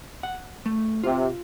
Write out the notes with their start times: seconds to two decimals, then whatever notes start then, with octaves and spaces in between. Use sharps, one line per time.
0.23 F#5
0.66 A3
1.03 C3 F4